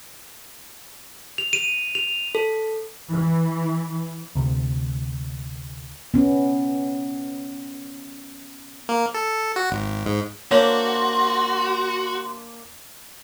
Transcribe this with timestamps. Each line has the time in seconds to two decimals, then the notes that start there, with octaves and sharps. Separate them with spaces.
1.38 F7
1.53 D#7
1.95 F7
2.35 A4
3.11 E3
4.35 D2 C3
6.14 B3 C#4
8.89 A#3
9.14 A4
9.56 F#4
9.71 G#1
10.06 G#2
10.51 A#3 D4 F#4 C5 C#5 C6